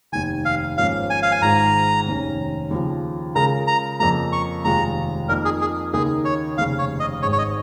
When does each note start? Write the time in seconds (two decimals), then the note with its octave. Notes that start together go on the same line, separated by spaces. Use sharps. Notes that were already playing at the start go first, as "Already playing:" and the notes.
0.12 F1 D#2 D#3 G#5
0.45 F5
0.77 G#1 G#2 F3 A#3 C#4 F5
1.10 G#5
1.22 F5
1.32 G#5
1.41 G#1 G#2 D#3 G#3 F4 A#5
2.06 F1 D#2 D#3 C#4
2.71 D#2 C#3 F3
3.35 C#3 G#3 F4 A#4 A#5
3.67 A#5
3.99 F2 C#3 F3 A#3 A#5
4.32 C#6
4.64 F1 D#2 D#3 G#3 F4 A#5
5.28 F2 F3 A#3 D#4 A#4
5.45 G#4
5.61 G#4
5.93 D#2 C#3 A#3 D#4 G#4 A#4
6.25 C#5
6.57 F1 D#2 C#3 F5
6.79 C#5
7.00 D#5
7.22 G#1 G#2 G#3 C#5
7.32 C#5
7.38 D#5